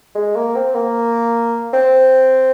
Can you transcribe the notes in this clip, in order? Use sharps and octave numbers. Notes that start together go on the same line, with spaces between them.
G#3
A#3
C4
A#3
C4